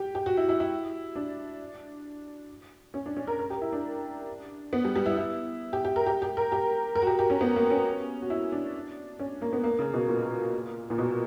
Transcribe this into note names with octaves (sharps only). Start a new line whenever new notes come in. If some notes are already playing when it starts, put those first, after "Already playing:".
Already playing: G4
G4
F#4
E4
E4
E4
D4
C#4
D4
C#4
A#4
A#4
G4
E4
D4
B3
G3
G3
E4
E4
G4
G4
A#4
G4
G4
A#4
G4
A#4
F#4
G4
G4
C#4
B3
A#3
C#4
F#4
E4
D4
C#4
A#3
B3
A#3
C#3
B2
A#2
A#2
B2